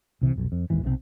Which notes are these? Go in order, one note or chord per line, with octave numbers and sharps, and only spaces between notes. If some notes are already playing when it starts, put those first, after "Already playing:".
C2 C3 E3
F1 B1
F2
A1 D#2 G#2 E3
B1 C3 F3 C4